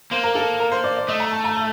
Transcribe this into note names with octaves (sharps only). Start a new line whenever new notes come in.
A#3 C5
A#4
A4
A#4
C5
D5
D5
A3 D#5
A#5
A5
A#5
A5